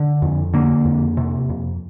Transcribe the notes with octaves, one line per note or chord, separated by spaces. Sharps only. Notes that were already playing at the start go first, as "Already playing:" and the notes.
Already playing: D3
F2
D3 A#3
F2
C3
F2